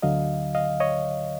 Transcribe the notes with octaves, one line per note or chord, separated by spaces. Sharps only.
D2 D3 F#3 D#5 F5
D#5 F5
C#5 D#5